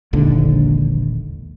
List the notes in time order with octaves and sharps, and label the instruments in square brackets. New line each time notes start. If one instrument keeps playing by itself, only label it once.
[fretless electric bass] E1 A#1 D#2 D3